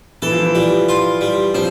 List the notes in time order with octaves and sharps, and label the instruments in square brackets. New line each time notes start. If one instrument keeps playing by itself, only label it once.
[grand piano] E3 [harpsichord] A4
[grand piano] F3
E3
[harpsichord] G3
F4
G3
[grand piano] F3 [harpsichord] C4